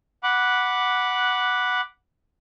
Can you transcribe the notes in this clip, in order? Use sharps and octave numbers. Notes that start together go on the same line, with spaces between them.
F#5 B5 D6 F#6